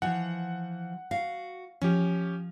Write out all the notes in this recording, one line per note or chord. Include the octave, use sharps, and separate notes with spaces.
E3 F3 F4 F#5
F#4 F5
F3 C#4 G4